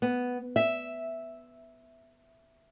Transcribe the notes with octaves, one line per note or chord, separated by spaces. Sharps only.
B3
E5